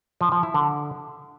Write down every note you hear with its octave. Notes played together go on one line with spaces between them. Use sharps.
F3
F3
E4
D3